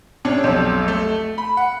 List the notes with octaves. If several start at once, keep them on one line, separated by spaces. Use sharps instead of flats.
C3 C#4 D4
B1 F2
A3
B5
F#5